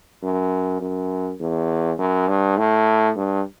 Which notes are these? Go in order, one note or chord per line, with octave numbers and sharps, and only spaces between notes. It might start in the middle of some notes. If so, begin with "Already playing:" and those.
F#2
F#2
E2
F#2
G2
A2
G2